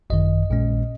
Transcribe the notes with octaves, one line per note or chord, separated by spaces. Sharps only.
G#1 F#2 D#3 D#5
A#1 A#2 G#3 C#4